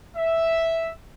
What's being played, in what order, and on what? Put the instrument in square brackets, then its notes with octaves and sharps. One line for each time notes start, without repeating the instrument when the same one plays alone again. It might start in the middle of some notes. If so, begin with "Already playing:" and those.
[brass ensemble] E5